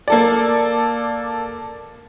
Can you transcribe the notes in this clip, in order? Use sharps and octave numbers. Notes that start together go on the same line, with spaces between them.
A#3 A4 D5